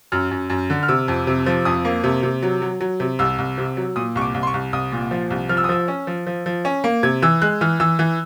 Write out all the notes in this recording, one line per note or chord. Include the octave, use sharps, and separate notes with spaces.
F#2 F6
F#2
F#2
D3
F6
C3 E6
F2
C3
F3
F2 D#6
A#3
C3
C3
F#3
F#3
F#3
C3
C2 E6
C2
C3
F#3
A#2 D#6
C2 C#6
D6
C2
C6
C#6
C2
C2 D#6
A#2
F3
C2
F3 F6
E6
D#6
F3 E6
C#4
F3
F3
F3
C#4
A#3
C3 G#6
E3 E6
G#3 F#6
E3 F6
E3 E6
E3